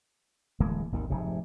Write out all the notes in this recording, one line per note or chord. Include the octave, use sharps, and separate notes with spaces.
D1 E3 G#3 A#3
G#1 D#2 D#3
F1 G#2 C3